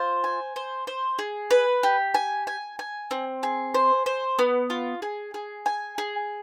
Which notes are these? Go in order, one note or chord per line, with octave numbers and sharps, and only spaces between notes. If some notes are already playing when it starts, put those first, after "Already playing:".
Already playing: F4 C5
G#5
C5
C5
G#4
B4
G4
G#5
G#5
G#5
C4
G#4
C5
C5
B3
F4
G#4
G#4
G#5
G#4